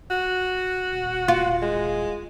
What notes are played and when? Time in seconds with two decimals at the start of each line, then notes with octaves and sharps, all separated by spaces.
0.10 F#4
0.92 D#1
1.28 F4
1.62 G#3